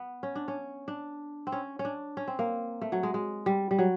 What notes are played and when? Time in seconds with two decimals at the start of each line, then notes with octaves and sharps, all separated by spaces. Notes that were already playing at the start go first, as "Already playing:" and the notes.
Already playing: B3
0.23 C#4
0.35 D4
0.48 C#4
0.88 D4
1.47 C4
1.52 C#4
1.79 C#4
1.85 D4
2.17 C#4
2.28 C4
2.39 A#3
2.81 A3
2.92 F#3
3.03 G#3
3.14 G#3
3.46 G3
3.71 G3
3.79 F#3